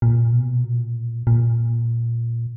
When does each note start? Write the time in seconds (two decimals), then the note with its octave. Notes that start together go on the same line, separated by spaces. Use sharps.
0.02 A#2
0.32 B2
0.64 A#2
1.27 A#2